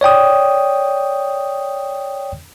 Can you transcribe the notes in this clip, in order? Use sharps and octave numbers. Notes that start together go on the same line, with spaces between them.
C#5 D5 G5 D#6